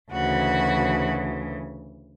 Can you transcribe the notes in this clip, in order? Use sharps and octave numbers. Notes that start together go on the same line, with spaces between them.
D2 C#3 E3 F#4